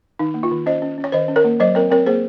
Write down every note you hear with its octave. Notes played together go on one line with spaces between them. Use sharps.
D#3 D#4
A#3
F4
D#3
C#4 C5 D#5
C#4
C#4
C#5
D#3 C5 D#5
C#4
A#4 C#5
A#3
F#3 C5 D#5
C4 A#4 C#5
C4 A#4 C#5
A#3 G#4 C5